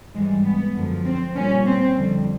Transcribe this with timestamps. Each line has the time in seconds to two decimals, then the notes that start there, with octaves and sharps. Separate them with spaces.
0.14 G#2 E3 G3 G#3
0.45 B3
0.76 F#2 D3 F3
1.06 C4
1.35 A#2 G3 C#4
1.66 C4
1.96 F2 D3 G3